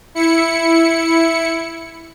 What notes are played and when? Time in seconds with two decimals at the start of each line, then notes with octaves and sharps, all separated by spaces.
0.15 E4 C#7